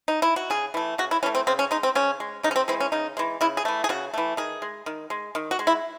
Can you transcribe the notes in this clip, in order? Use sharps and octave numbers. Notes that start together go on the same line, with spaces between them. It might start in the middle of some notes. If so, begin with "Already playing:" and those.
D#4
E4
F#4
C#3 G#4
E3 A3
C#3 F#4
E4
E3 A3 C#4
C4
C#3 C4
C#4
G#3 D#4
C4
C#3 C#4
G#3
C#3 D#4
C#4
C4
E3 G#3 C4
C#4
C#3 D#4
E3 G#3
C#3 E4
G#4
E3 A3
G#4
C#3 F#4
E3 A3
D#3 G#4
G#3
D#3
G#3
D#3
F#4
G#3
E4